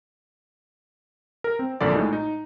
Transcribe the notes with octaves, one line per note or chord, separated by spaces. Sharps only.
A#4
C4
A#1 F#2 D3 D5
A2 G#3 D#4
D#4